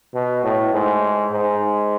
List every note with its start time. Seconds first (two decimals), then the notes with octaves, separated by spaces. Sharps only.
0.14 B2
0.44 A2
0.73 G#2
1.32 G#2